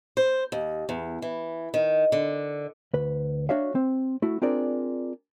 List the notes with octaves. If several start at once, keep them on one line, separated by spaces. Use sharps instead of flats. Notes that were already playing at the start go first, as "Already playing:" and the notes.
C5
D#2
E2
E3
D#3
D3
D2 B4
D4 F#4 C#5 E5 F5
C4
A3 E4 F#4
C4 D4 F4 G#4 A#4 D5